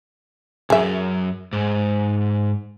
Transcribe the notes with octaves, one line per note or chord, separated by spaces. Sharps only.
C2 F#2 G#4 E5
G#2